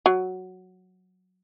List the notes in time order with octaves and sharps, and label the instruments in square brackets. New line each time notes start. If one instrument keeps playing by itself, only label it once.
[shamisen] F#3